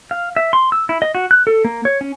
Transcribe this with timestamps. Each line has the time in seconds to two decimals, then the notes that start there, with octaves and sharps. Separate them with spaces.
0.11 F5
0.36 E5
0.53 C6
0.72 E6
0.89 E4
1.02 D#5
1.15 F#4
1.31 F#6
1.47 A4
1.65 A#3
1.85 C#5
2.01 C#4